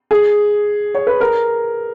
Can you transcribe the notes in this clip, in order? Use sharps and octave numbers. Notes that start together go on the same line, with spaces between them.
G#4
C#5
B4
A#4